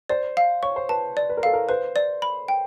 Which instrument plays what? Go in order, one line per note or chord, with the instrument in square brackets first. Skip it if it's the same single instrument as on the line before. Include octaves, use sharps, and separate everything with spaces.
[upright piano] C5 [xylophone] D5
[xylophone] F5
[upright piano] C#5 [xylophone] C#6
[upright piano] C5
[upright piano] B4 [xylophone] A5
[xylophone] D5
[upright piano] B4
A#4
[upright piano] A4 [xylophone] F5
[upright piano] A#4
[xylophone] B4 [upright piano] C5
[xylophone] D5
B5
G5